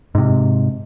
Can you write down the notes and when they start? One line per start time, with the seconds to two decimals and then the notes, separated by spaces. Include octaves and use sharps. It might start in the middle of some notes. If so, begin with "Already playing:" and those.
0.15 G#2 C3